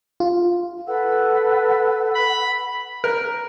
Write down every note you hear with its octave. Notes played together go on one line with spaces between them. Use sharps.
F4
A4 B4 F#5 E6
B5
A#4